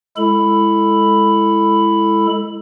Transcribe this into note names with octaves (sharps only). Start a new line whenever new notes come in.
G#3 E4 A4 B5